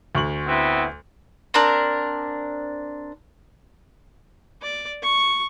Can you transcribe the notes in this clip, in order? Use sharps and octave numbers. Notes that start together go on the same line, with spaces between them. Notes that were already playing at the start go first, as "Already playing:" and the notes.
D2 C#6 F#7
B3 C4 E4
C4 D4 A#4
D5
C#6